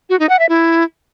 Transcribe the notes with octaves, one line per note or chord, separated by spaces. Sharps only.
F#4
D#4
F#5
E5
E4